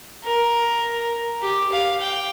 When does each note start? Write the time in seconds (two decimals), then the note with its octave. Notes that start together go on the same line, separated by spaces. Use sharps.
0.24 A#4
1.42 G4
1.72 F5
2.00 G5